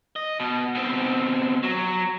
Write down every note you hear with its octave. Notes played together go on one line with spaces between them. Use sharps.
D#5
B2
B2 C4
F#3